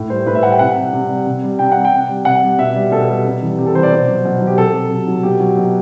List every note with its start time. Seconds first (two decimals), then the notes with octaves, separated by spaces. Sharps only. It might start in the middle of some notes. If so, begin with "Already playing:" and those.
Already playing: A2
0.10 G3 C5
0.26 A2 B4
0.35 E5
0.43 G3 F#5
0.51 G5
0.59 C3 F#5
0.77 G3
0.93 C3
1.09 G3
1.26 C3
1.43 G3
1.59 C3 G5
1.72 G3 F#5
1.85 G5
1.92 C3
2.09 G3
2.25 C3 F#5
2.42 G3
2.58 B2 E5
2.75 G3
2.91 B2 A4
3.08 G3
3.25 C3
3.42 E3 G3
3.58 C3 G4
3.66 A4
3.74 E3 G3 C5
3.83 D5
3.91 B2 C5
4.08 F#3
4.25 B2
4.41 F#3
4.47 G4
4.58 C3 A4
4.74 F#3
4.91 C3
5.07 F#3
5.23 B2 G4
5.40 F#3
5.57 B2